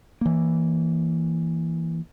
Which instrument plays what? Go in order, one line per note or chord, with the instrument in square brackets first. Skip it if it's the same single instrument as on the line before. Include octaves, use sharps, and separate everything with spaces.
[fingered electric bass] E3 A#3